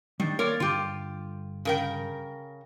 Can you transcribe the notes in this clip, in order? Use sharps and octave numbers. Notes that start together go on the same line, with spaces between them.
D#3 G3 D4
A#3 A#4 C#5 D5 C6
G2 D3 F4 G4
C#3 A#4 G5